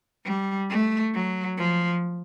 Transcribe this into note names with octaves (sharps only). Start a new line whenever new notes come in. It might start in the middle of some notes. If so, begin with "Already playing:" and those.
G3
A3
F#3
F3